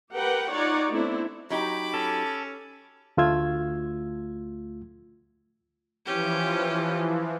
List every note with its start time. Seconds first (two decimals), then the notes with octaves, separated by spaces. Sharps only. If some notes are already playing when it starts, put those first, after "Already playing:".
0.12 G4 A#4 B4 F#5 G5
0.52 D#4 F4 C#5 D5 F#5
0.90 A3 B3 C4 D4 E4
1.50 F#3 D#4 G4 B5 D6
1.94 C#4 A4
3.17 D2 A3 F4 E6 G#6
6.06 E3 F3 C#4 G4